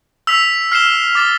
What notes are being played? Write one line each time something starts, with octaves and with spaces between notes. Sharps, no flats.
E6 B6 F7
F6 C7 E7 G7
D6 A6 E7 G7